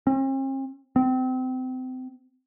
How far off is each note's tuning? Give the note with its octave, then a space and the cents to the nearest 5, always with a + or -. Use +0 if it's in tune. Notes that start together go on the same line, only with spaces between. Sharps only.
C4 +45
C4 -30